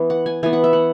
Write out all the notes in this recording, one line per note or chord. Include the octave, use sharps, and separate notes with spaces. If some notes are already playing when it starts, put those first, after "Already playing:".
Already playing: E3 B3
F#5
G#5
E3 B3 G#5
F#5
E5
F#5